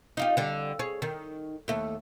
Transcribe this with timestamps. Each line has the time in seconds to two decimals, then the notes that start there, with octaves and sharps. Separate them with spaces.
0.17 D#4 F4 G4
0.37 D3 G3
0.79 G#4 C#5
1.02 D#3
1.68 D#2 A3